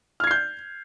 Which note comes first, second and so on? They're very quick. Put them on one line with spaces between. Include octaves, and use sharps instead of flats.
F6 G#6 C7 G6